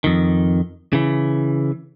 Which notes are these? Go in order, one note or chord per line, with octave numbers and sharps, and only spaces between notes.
F2 D#3
C#3 E3